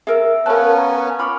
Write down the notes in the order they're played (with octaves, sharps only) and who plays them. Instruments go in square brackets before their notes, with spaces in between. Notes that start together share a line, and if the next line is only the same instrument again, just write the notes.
[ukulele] G#4 A#4 [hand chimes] E5 E6
[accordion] B3 C#4 [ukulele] A#4 A5 [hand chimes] F5 F#6
[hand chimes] A#5
[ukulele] F4 B5 [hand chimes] C#6 D6 F6